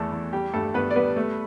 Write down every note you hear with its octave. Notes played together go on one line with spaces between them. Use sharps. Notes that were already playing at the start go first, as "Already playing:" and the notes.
Already playing: E2 E3 A3 B3 A4
E2
G3 G4
G2 A3 A4
G2 B3 B4
D5
G3 B3 B4
A3